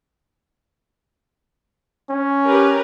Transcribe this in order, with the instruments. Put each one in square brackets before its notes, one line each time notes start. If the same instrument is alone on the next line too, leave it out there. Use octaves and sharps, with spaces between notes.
[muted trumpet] C#4
[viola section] G4 A#4 B4